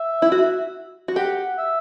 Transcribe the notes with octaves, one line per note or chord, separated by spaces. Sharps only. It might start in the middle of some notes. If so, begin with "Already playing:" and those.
Already playing: E5
E4
F#4
F#4
G4 F#5
E5